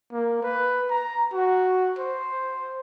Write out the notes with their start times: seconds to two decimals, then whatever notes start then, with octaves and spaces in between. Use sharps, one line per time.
0.12 A#3
0.43 B4
0.90 A#5
1.33 F#4
1.99 C5